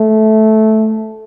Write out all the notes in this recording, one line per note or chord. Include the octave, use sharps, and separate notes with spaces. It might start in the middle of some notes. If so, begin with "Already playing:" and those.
Already playing: A3